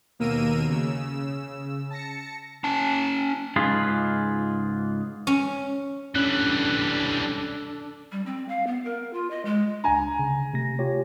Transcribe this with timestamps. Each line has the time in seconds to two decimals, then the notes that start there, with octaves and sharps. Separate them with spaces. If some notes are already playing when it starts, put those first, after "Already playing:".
0.19 D#2 B2 A#3 A#4 E6 D#7
0.69 C#3 E6
1.90 A5 A#6 C#7
2.64 C#4 A5
3.56 C#2 G#2 F4 G#4 B4 F5
5.27 C#4
6.15 E3 G3 C#4 D4 A4 F#6
8.12 G3
8.26 C4
8.49 F5
8.67 B3
8.85 A#4
9.13 F4
9.30 D#5
9.45 G#3
9.84 C#2 D4 G#5 A#5
10.19 C#3
10.54 C3 A3 A#6
10.79 F4 G4 C#5